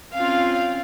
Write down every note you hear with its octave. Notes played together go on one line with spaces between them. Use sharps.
C4 C#4 F4 F5